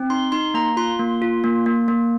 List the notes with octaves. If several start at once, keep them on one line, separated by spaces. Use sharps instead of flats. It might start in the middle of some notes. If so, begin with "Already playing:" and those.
Already playing: C4
D#4 C6
D#4 C6
A#3 A#5
F4 C6
A#3
F4
A#3
A#3
A#3